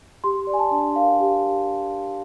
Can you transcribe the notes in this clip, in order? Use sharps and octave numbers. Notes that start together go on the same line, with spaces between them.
G4 C6
D5
G#5
A5
D4
A#4 F5
G4